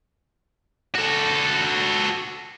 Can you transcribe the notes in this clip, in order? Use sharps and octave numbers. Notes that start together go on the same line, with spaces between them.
F#4 A4